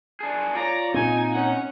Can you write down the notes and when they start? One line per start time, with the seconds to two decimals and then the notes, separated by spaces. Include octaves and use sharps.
0.20 D4 G#4
0.55 F4 C#5 D5 A#5
0.94 A#2 C4 D#4 G#5
1.32 C#4 F#5